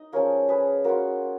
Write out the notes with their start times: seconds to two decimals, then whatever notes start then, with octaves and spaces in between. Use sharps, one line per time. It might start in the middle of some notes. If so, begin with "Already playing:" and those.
Already playing: D#4 D#5
0.12 F3 G#3 C#4 F4 A#4 C#5
0.48 G#4 B4
0.84 A#3 F4 F#4 A#4